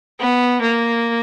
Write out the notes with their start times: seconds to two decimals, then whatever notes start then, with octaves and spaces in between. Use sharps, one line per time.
0.19 B3
0.61 A#3